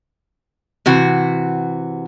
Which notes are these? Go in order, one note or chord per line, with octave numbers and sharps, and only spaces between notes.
C3 E3 F#4